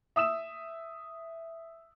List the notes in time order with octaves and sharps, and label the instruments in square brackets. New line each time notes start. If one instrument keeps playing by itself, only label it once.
[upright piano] E5 D#6 E6 E7